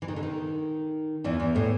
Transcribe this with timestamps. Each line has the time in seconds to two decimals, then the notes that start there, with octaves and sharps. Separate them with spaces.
0.02 E3
0.08 D#3
0.16 D3
0.23 D#3
1.24 E2 E3
1.40 E2 E3
1.55 A2 A3